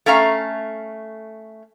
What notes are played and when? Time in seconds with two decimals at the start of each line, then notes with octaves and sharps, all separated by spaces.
0.06 A3 C#4 F5 A#5